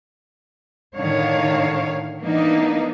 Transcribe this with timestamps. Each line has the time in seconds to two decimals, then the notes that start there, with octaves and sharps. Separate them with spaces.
0.95 A2 D3 D#3 C#5 F5
2.20 E3 A#3 B3 D4 D#4